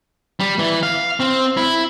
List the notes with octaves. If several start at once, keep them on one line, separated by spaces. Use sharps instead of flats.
G3
E3
F5
C4
E4